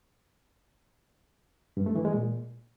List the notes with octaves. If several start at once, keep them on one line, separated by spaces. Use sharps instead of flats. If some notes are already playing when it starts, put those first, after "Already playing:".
G2
A3
E3
G#3
A#2